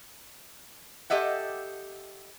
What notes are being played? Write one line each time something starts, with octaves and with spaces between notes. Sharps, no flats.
G4 A4 D#5 E5 F#5